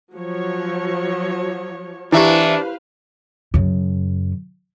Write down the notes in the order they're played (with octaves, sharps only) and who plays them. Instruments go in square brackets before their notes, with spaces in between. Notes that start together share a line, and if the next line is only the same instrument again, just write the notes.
[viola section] F3 F#3 C#5
[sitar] E3 E5 [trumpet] D4 [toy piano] E4 G4 [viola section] B4 C5 F5
[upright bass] F#2 C#3